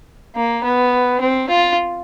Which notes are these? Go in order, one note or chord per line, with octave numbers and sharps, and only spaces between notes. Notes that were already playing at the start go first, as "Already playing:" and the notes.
A#3
B3
C4
F4